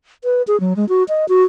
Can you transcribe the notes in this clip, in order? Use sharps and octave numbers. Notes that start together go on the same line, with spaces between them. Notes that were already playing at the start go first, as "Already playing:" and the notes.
B4
G#4
F#3
G#3
F#4
D#5
F#4